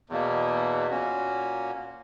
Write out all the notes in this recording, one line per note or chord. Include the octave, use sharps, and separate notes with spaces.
E2 B2 A#3
A#2 A#3 C#4 F#4